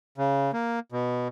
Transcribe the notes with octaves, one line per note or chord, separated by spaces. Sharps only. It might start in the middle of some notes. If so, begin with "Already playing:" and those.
C#3
A#3
B2